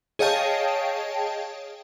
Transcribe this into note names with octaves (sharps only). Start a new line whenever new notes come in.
G#4 C#5 D#5 F5 G5 A5